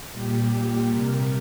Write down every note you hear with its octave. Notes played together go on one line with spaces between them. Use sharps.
A#2 G3 G4
C3 G3 A#4